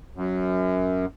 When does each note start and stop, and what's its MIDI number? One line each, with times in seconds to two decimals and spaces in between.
0.16 1.06 42